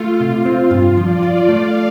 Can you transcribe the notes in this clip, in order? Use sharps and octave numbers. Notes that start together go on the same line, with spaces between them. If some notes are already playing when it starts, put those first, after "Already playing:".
Already playing: A3 F4
C3
C4
G2
F3 D5
F4
A3 F5